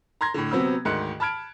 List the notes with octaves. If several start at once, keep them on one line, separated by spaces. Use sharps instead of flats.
A#5 C6 G#6 A#6
A2 D3
C3 F#3 B3 C4 B5 E6
D2 G#2 D#3 C6 F#6 C#7
A5 B5 F6 G#6 D7